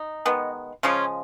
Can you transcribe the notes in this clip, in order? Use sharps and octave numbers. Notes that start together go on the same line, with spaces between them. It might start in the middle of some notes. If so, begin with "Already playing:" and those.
Already playing: D#4
D#3 G#3 B3
C#3 F3 G#3 C#4 F4